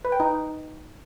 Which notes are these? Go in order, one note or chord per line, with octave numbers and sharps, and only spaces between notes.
B4
G5
D#4